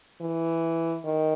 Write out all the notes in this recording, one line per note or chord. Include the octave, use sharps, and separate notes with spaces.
E3
D#3